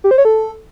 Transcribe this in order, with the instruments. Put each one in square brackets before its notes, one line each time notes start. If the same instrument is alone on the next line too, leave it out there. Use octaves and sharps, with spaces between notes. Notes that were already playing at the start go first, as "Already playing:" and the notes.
[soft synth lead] G4
C5
C#5
A4